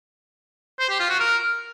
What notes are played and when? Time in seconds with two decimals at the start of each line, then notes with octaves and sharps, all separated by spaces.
0.80 C5
0.90 G4
1.00 F4
1.10 F#4
1.20 A#4